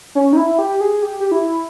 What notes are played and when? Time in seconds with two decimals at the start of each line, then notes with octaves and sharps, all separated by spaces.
0.15 C#4
0.33 D#4
0.37 E4
0.59 G4
0.81 G#4
1.03 G4
1.20 G4
1.32 E4